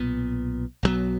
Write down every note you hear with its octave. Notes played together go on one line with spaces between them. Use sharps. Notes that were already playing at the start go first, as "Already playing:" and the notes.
Already playing: B1 A#2 B3
B1 A#2 F#3 B3